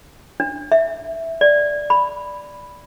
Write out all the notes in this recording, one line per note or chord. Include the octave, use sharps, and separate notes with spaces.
D4
E5
D5
B5